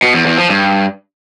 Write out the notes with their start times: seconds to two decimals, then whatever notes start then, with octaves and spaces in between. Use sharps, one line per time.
0.03 B2
0.14 E2
0.26 E2
0.38 F3
0.49 G2